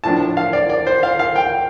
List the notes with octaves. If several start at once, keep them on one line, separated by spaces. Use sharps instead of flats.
A2 F3 D4 A5
F5
D5
D5
C5
F5
F5
G5